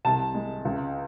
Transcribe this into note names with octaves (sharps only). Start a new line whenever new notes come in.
C2 A5
G#3
C#2